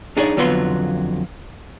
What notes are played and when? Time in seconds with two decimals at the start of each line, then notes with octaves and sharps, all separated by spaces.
0.17 D4 D#4 G#4 C#5 D5
0.37 F2 D3 F#3 B3 F4 C6